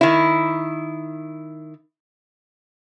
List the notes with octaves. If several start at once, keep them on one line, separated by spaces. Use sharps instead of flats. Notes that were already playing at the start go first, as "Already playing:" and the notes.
D#3 E4